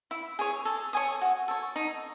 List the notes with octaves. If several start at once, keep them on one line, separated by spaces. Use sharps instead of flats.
E4
G#4 C#5
A4
C#5 G#5 D#6
F#4
A4 C#5
D#4